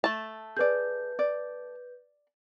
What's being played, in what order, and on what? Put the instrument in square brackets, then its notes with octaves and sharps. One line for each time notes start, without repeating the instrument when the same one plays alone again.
[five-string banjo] A3 A5
[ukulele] G#4 D5 [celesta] B4 G6
[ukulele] D5